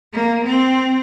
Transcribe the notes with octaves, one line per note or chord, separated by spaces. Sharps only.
A#3
C4